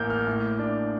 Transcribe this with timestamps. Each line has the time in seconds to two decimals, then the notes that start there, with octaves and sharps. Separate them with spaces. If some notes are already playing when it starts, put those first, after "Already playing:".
Already playing: A1 A#3 F6 G6
0.10 F6
0.27 A2
0.59 D4